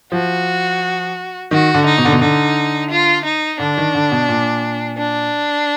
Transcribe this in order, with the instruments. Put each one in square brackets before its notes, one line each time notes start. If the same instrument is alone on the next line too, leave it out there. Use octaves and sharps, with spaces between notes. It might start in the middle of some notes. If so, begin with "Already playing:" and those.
[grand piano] F3 [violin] F#4
[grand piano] D#3 [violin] F#4
[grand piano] D3
[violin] D#4
[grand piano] B2
D3
B2
[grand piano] D3 [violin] D#4
[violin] F4
D#4
[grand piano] D3 [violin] D4
[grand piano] D#3
D3
B2
A#2
[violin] D4